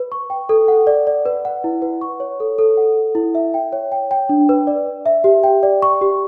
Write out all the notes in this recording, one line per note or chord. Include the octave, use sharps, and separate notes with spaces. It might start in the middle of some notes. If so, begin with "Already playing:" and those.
Already playing: B4
C#6
G5
A4
F#5
D5
D5
B4
F#5
E4
B4
C#6
C#5
A4
A4
F#5
A4
E4
E5
G5
C#5
G5
G5
D4
B4
D5
D5
E5
G4
G5
D5
C#6
G4